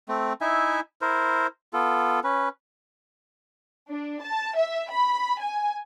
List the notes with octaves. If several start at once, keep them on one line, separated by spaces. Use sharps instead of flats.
A3 C4
D#4 E4 E5 G#5
E4 A#4 C5
B3 F4 A4
C#4 B4
D4
A5
E5
B5
G#5